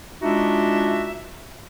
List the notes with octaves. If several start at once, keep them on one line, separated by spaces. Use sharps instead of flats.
G#3 D4 D#4 F4 F#4 E5